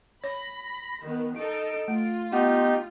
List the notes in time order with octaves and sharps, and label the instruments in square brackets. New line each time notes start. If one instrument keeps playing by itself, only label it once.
[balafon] C#5 [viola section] B5 [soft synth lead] A#6
[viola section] D#3 B3
[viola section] D#4 A4 [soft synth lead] D7
[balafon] A3 [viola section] F4
[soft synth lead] B3 [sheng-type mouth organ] D#4 G4 [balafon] F#5